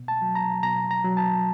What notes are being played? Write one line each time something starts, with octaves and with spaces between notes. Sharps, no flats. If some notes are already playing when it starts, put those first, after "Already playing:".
Already playing: B2
A5
F#3
A#5
B2 A#5
A#5
F#3
A5